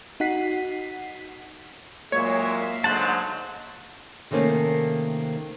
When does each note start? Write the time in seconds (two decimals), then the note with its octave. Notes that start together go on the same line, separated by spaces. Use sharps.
0.20 D#4 F#4 F#5 B6 C7
2.12 A#2 F#3 G#3 A#3 C#5 E5 F5
2.84 G#2 D3 F#3 C5 F#5 A5
4.31 C3 D#3 A3 A#3 C4 C#4